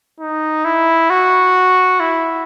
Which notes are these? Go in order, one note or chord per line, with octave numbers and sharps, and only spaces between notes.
D#4
E4
F#4
E4